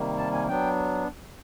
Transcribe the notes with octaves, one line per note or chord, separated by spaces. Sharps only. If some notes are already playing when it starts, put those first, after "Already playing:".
Already playing: C3 D#3 G3 A#3
A5
G#5
F#3 B3 D4 G5